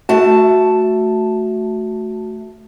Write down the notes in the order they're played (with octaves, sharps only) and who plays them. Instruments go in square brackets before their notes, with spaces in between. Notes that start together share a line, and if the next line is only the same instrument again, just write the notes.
[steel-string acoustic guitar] A3 A5 [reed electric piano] F#4